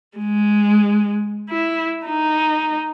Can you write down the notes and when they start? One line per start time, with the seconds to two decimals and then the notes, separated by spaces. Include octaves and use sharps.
0.18 G#3
1.50 E4
2.06 D#4